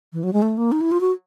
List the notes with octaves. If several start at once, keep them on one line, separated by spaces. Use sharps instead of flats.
E3
F#3
G#3
A3
A#3
D#4
E4
F4
F#4